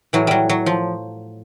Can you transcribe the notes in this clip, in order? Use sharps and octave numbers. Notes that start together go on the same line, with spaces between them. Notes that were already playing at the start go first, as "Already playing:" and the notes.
A2 E3 F#3
F#3 G3
F#3
F3